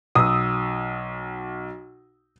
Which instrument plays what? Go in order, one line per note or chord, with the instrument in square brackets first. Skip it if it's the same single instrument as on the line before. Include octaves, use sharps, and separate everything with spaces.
[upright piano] B1 [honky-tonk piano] D#6 E6